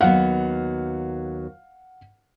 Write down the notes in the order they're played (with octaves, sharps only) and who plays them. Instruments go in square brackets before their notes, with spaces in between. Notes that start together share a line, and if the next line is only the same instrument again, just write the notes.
[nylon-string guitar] D#2 F#3 B3 [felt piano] F5 F#5